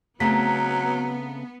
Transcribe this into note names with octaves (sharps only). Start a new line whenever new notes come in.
C#3 F#3 A3 B3 C4 A#5 B6